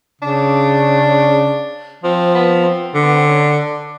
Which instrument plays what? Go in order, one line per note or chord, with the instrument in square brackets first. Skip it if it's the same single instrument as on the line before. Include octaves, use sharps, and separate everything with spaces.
[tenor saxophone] C#3 [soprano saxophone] D4
[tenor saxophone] F3 [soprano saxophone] C4
[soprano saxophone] B3
C4
[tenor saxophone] D3
[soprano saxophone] B3
C4
C#4
D4